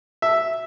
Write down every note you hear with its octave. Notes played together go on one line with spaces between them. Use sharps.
E5